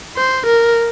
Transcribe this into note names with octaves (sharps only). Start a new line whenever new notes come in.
C5
A#4